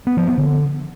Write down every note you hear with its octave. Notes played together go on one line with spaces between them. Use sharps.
B3
F3
B3
D3